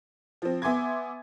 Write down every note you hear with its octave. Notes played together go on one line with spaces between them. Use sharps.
F3 C4
B3 E5 G#5 C6 D6 G#6